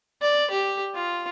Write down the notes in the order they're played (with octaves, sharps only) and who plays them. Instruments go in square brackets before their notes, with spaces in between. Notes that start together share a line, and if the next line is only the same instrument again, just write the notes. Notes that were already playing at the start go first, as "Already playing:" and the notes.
[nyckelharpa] D5
G4
F4